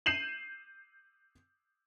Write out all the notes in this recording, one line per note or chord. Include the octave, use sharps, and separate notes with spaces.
G6 C7 D#7 E7 F#7